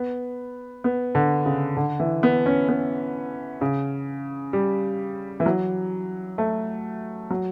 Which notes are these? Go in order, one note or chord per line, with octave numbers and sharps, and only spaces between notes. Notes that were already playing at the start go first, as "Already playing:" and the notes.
Already playing: B3
B3
D3
C#3
D3
E3
B3
C#4
B3
C#3
G3
E3
F#3
A3
F#3